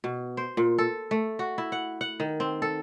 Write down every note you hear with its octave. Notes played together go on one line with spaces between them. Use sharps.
B2
C5
A#2
A4
A3
F#4
E4
F#5
F#5
D#3
C4
A4